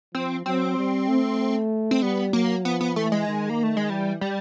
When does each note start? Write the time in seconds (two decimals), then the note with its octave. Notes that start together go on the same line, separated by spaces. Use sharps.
0.14 F3 C4
0.46 F#3 C4
0.77 G3
1.08 A3
1.91 C4
2.02 G3 B3
2.33 F#3 A#3
2.65 F3 B3
2.81 B3
2.96 E3 A3
3.12 G#3
3.27 D#3
3.50 A#3
3.63 A3
3.77 G#3
3.90 E3 G3
4.21 G3